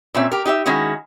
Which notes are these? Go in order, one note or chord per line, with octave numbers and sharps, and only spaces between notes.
A#2 C4 C#4 E5
G4 A#4
D#4 G4 D#5 E5
D#3 G#3 C#4 E4 F#4